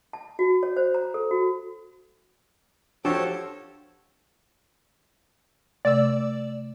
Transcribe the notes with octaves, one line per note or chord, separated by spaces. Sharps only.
A5
F#4
C#5
C5
A#5
A4
F#4
F3 D4 F#4 G4 A4 C5 C#5 A5
C3 A3 D5 E6